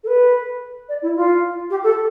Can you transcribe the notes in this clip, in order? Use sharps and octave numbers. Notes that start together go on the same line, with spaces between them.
A4
B4
D5
E4
F4
G4
A4